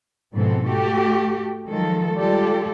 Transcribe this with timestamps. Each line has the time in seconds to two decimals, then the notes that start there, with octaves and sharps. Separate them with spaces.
0.34 G#2 B2 F3 B3 C4 A4
0.67 A3 F#4 G4 A4
1.69 D#3 F3 F#3 G#3 A4
2.18 G3 G#3 F4 G4 A4 D5